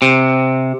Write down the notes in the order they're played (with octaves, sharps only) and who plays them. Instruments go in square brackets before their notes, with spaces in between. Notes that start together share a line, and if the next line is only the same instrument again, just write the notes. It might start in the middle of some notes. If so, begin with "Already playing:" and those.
[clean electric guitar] C3